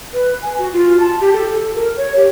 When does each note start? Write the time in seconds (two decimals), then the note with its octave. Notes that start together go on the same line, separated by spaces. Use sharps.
0.14 B4
0.42 G#5
0.58 F#4
0.73 F4
1.00 A5
1.21 G4
1.33 A4
1.74 A#4
1.97 C#5
2.16 G4